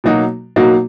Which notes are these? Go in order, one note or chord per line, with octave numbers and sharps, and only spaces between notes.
B2 F#3 A#3 D#4 F#4
B2 F#3 A#3 D#4 F#4